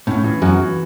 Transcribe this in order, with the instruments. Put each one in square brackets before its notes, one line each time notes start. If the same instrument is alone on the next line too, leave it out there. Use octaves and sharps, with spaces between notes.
[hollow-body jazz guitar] A2 [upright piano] C#4
[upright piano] E3
[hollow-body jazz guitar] F#2 [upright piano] F#4
[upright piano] E3